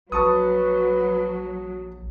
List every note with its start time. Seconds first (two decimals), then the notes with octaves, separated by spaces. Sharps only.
0.12 A#1 F#3 B4 A5 C#6 D#6